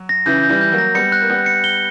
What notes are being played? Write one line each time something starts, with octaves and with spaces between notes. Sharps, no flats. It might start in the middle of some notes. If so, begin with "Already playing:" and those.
Already playing: F#3
A#6
C#3 E3 G6
G6
E3 G3
G6
F#3 A#3
A#6
G3 B3 C#7
F#6
A#3
G3 B3 F#6
C#7
G7